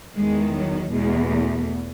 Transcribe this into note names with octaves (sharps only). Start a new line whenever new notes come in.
E2 D#3 G#3
F#3
E2 B2 G#3
A3